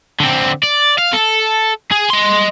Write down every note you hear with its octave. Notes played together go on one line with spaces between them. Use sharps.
D3 C4
D5
F5
A4
G#4
D#5 C6